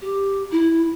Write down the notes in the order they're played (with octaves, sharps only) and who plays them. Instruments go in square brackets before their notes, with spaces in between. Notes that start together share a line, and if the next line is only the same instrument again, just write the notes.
[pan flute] G4
E4